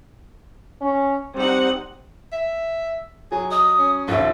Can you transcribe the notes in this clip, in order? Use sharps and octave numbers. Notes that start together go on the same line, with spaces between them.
C#4
G3 C4 D#4 F#5
E5
F#3 G#4
D#5 D#6
C#4
A#1 D#2 F4 E5